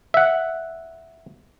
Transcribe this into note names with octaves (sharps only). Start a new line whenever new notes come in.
E5 F#5